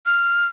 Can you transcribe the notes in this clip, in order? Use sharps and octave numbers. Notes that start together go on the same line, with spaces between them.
F6